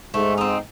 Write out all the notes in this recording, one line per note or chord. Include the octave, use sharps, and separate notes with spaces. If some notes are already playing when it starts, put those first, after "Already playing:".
G#2 A3
C4 D#4